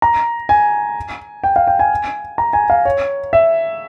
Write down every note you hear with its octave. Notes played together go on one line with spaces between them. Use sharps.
A#5
G#5
G5
F5
G5
G#5
A#5
G#5
F5
C#5
E5